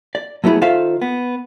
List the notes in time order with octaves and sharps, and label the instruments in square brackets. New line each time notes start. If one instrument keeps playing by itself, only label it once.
[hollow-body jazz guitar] D5
F#3 A3 B3 E4 G#4
D#3 F4 A4 C5 E5 F5
B3